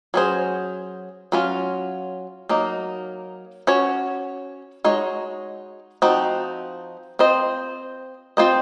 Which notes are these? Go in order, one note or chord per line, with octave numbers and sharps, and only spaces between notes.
F#3 C#4 G#4 C5
F#3 C#4 F4
F#3 A#3 D#4
C#4 F#4 C#5
G#3 D#4 F#4 C#5
F3 C4 D#4 F#4
C4 F4 C5 D#5
C4 F4 C5 D#5